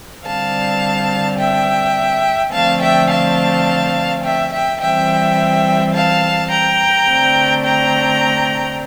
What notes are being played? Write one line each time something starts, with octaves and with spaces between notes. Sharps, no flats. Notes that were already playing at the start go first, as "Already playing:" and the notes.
D3 G3 C4 F5 A5
E5 G5
D3 F3 A3 C4 F5 A5
E5 G5
F5 A5
E5 G5
E5 G5
E3 G3 C4 E5 G5
F5 A5
G5 A#5
D3 A3 C4
G5 A#5